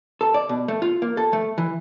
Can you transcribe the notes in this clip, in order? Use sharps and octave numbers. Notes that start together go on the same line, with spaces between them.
A4
D5
B2
A3
F4
A#3
A4
A3
E3